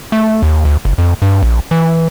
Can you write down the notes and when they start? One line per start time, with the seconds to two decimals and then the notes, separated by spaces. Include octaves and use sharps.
0.12 A3
0.42 D#2
0.65 D2
0.85 F#1
0.98 F2
1.22 G2
1.42 A#1
1.71 E3